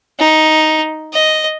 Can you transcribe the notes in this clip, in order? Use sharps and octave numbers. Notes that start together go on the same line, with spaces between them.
D#4
D#5